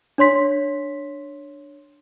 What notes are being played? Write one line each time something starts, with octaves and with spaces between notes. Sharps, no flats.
D4 C#5 C6 B6